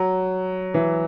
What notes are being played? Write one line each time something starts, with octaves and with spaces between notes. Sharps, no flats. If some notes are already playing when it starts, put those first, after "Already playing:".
Already playing: F#3
E3